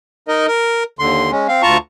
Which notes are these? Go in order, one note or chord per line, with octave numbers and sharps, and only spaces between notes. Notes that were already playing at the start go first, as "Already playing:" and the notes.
D#4 A#4 D#5
A#4
D#2 D3 C6
G#3 C#4
C4 F5
D2 F4 A5 A#5 C#6